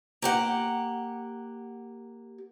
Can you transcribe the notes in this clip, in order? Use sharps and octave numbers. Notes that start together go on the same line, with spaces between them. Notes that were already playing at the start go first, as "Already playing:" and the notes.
A#3 G4 F#5